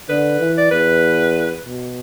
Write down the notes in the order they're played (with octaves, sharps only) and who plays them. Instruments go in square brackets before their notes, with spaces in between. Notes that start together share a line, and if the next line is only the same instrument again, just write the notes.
[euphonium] D3 [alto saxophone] B4
[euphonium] E3
[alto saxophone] D5
[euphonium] E2 [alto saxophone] B4
[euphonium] B2